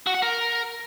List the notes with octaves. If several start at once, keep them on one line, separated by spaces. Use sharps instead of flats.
F#4
F#5
A#4